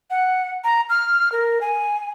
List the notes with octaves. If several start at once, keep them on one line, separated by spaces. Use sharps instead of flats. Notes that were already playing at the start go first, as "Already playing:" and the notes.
F#5
A#5
F6
A#4
G#5